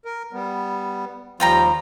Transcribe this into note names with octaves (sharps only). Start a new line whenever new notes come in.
A#4
G3 B3
D#2 F3 G3 F4 G5 A#5